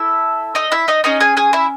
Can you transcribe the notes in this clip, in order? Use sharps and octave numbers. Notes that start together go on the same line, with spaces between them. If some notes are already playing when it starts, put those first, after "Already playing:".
Already playing: E4 A4 E5
D#4 D#5
E4 E5
D#4 D#5
C#4 D#4 G#4 D#5
G#4 G#5
G#4 G#5
E4 E5